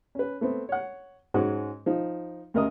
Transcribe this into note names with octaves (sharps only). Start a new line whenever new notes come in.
C#4 B4
A3 B3 C4
C#5 F#5
G#2 G#3 C#4 F#4
F3 D#4
D2 C#3 A#4 D#5 D#6